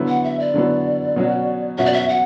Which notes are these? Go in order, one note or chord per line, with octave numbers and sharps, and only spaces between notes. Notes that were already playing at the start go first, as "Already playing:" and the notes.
Already playing: D3 F#3 B3 E4
F#5
E5
D5
D3 F#3 B3 E4
B2 F#3 C#4 F#4
B2 F#3 C#4 F#4 E5
D5
E5
F#5